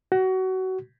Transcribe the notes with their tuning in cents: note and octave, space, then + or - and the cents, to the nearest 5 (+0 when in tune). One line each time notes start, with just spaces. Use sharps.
F#4 +25